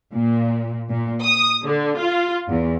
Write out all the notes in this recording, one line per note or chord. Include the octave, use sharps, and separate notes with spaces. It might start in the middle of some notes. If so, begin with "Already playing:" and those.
A#2
A#2
D#6
D3
F4
E2